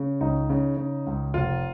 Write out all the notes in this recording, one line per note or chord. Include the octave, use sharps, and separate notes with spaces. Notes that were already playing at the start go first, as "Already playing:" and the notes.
Already playing: C#3
C#2 D#4
C#3
C#3
C#2
F1 F4